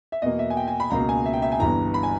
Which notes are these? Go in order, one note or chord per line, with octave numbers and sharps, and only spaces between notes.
E5
E2 B2 A#3 D#5
E5
G#5
G5
G#5
B5
C#2 B2 A#3 A#5
G#5
E5
G5
E5
G#5
G1 G2 E3 A#5
B5
G#5